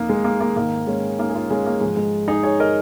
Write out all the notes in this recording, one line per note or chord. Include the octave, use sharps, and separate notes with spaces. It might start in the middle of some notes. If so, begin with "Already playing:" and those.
Already playing: F2 A#3 D#4
G#3
A#3
A#3
G#2 D#3 A#3
G#3 C#4
A#3 D#4
G#4
C#4 F4
G#3 C#4
A#3
G#2 F3 G#3
G#3
D#4 G#4
G#4 C#5
A#4 D#5